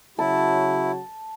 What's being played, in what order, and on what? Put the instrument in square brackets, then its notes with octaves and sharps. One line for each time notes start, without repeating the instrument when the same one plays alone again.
[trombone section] C#3 F#3 F#4 [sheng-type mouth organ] E4 [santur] A5